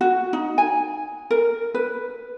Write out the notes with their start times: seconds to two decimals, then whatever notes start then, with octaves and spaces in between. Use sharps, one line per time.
0.01 F#4
0.33 D#4
0.58 G#5
1.31 A#4
1.74 B4